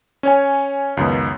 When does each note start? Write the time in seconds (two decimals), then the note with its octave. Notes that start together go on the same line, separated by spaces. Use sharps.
0.23 C#4 C#5 G#5
0.97 C#2 F#2 D#3 B3